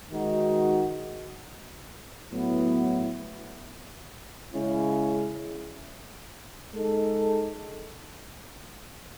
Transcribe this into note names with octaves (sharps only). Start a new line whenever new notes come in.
D#3 G#3 D#4 F#4
A2 F#3 B3 E4
C#3 G#3 C#4 E4
G#3 D#4 A4